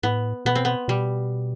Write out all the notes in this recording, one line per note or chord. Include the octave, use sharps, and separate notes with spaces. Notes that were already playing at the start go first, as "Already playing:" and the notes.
A2 B3
B2 B3
C4
B3
B2 G3